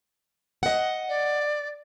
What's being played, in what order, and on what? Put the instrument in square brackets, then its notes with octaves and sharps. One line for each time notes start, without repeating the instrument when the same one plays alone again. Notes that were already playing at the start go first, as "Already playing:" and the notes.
[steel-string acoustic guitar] D#5 F#5
[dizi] D5